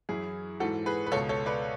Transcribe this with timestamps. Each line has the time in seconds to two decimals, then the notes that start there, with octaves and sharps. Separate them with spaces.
0.09 F#2 E3 E4 G#4
0.60 G#2 E3 F#4 A4
0.86 G#4 B4
1.06 B4
1.12 C#2 B2 A4 C#5
1.29 A4 C#5
1.46 B4 D5